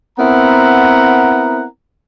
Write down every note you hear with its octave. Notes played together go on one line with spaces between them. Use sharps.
B3 C4 E4 A#4 F#5 A#5